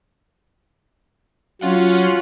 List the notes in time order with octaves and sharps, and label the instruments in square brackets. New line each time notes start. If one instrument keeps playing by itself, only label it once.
[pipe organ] F#3 [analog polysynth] C#4 F4 F#5